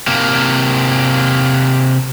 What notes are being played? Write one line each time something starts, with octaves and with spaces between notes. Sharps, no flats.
C3 A#3